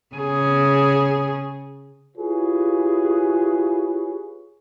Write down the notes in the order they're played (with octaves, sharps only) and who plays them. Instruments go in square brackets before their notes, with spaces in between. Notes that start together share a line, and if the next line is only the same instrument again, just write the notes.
[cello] C#3 G#4
[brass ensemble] E4 F4 G4 G#4 B4 C#5